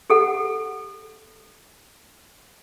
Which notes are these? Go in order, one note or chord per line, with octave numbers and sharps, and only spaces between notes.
G4 A4 F#5